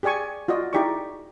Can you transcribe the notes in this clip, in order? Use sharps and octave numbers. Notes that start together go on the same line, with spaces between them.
G4 G#4 D5 G#5 C#6
F4 F#4 D5 D#5
D#4 E4 G4 G#4 D5 C#6